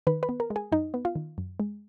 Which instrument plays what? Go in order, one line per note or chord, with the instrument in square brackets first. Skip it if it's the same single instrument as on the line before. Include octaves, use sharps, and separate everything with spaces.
[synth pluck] D#3 B4
B4
B3
A#4
G#3
G#4
F#2 D#4
B3
F4
D#3
F#2
G#3